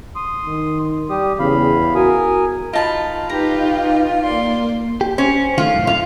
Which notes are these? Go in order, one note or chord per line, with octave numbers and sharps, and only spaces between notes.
C6 D#6
D#3
G3 G4 D#6
E2 C#3 F5 B5
F#4 A#4 G#5 D#6
D#4 F4 A5 B5
D#4 G4 B4 A#5
A#3 D5 C6
G4
C#4 C5
D#3 A3 F4
C2 F#2 A2
F4